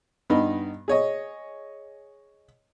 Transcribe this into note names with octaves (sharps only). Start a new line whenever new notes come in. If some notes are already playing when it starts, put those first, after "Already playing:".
G2 B3 D#4
G#4 C#5 D#5